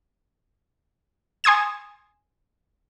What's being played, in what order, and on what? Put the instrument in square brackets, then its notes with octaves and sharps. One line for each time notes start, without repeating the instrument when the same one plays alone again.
[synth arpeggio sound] G#5 C6 D#6 G#6 E7